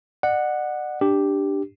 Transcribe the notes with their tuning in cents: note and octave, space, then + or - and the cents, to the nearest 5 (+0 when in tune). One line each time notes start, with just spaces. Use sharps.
D5 +40 F#5 -5
D4 +0 G4 +0